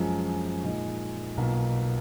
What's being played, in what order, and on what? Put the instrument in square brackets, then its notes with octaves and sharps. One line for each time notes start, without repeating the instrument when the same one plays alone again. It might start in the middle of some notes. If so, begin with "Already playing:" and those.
Already playing: [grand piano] F#2 F3 G#3
A#2 G#3 D#4
B1 B2 A#3 F4